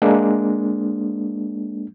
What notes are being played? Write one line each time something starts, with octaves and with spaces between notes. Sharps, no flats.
G#3 A#3 D4